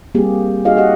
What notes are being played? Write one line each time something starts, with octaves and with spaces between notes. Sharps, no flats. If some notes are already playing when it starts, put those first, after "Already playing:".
G3 A#3 C4 G4 G#4
D#4 F#4 G#4 D#5 F5
G4 D#5 F#5